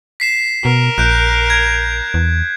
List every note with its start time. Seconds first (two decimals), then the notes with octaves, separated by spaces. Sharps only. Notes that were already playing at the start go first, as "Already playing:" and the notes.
0.20 B6 C7 E7
0.65 B2 A#4
0.98 A#1 F#6 G6 D7
1.50 G#6
2.14 E2